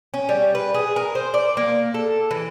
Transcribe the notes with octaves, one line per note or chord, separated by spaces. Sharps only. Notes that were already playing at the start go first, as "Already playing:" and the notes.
C#4
G3
B4
G#4
A#4
C5
D5
A#3
A4
E3